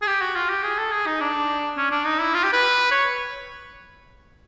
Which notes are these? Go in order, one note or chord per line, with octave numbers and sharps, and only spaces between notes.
G#4
G4
F#4
F4
G4
G#4
A4
G#4
D#4
D4
C#4
D4
D#4
E4
F4
G4
B4
C#5